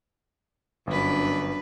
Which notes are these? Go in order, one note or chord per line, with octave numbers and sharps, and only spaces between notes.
G1 F#2 D4 B4